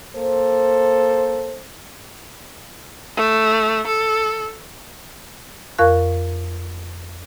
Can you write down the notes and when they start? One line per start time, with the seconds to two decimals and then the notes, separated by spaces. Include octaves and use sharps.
0.15 A#3 A4 C5
3.17 A3
3.87 A4
5.78 F2 A#4 F5 C#6 F#6